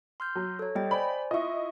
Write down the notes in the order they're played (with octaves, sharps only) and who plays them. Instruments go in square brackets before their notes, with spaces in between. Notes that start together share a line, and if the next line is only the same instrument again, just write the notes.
[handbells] C6 F6 G6
[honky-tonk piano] F#3
[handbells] A4 C#5
[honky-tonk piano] G3 [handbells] D#5 G5
[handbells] C5 D5 G#5 [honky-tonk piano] B5
[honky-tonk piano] E4 D#5 [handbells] F4 C#6